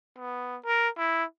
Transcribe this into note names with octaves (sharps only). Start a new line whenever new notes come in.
B3
A#4
E4